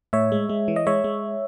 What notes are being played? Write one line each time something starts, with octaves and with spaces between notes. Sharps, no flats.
A2 C#5 E5
G#3
G#3
E3
D#5
G#3 C#5 E5
G#3